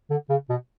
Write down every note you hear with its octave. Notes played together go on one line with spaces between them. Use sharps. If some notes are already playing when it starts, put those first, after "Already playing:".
D3
C#3
B2